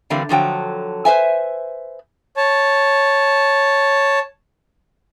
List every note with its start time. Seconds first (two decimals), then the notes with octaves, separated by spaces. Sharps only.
0.10 D3 E3 G3 A#3 C4
0.29 D3 F3 F#3 G5
1.05 B4 C5 E5 G#5
2.37 C#5 A5